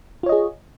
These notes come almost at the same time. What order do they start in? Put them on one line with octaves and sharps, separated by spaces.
F4 C#5 D#5 G#4